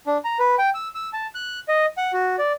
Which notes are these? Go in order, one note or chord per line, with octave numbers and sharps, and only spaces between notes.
D4
A#5
B4
G5
E6
E6
A5
F#6
D#5
F#5
F#4
D5